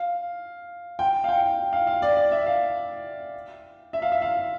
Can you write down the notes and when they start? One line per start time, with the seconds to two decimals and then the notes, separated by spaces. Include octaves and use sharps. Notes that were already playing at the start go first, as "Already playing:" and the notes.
Already playing: F5
0.99 G5
1.24 F5
1.29 G5
1.73 F5
1.87 F5
2.02 D5
2.17 D5
2.32 E5
2.46 F5
3.93 E5
4.02 F5
4.12 E5
4.22 F5